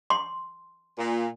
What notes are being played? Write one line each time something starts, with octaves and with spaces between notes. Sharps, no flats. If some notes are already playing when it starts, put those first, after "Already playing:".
C6
A#2